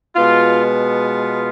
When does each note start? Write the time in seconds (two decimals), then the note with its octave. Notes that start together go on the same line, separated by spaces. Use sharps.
0.16 B2 G#3 B3 F4
0.65 F4